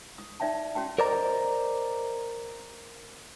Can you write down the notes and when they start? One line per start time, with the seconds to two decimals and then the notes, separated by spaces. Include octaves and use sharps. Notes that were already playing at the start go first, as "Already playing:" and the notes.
0.18 D#6
0.40 D#4 D5 E5 G5 A5
0.75 C#4 F#4 G5 A5
0.99 A#4 C5 D5 D#5 A#5